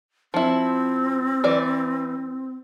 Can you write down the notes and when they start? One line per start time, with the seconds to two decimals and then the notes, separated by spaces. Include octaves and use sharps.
0.34 F3 C4 E4
1.44 E3 D5